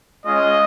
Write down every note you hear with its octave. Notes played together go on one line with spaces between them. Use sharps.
G#3 C#4 F4 D#5